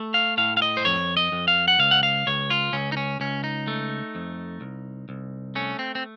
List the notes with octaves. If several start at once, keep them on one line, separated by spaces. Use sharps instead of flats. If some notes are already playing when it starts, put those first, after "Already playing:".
Already playing: A3
F5
A2 F5
F5
D#5
C5
F2 C#5
D#5
F2
F5
F#5
C#2 F5
F#5
F5
C#2 C#5
F4
C#2 C#4
D#4
C#4
C#2 C#4
D#4
A3
F2
C2
C2
A3 C#4
C4
C4